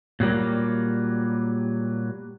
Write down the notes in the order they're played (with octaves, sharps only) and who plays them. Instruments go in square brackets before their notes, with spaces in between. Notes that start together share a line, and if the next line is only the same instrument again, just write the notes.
[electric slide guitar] A#2 F#3 G3 A#3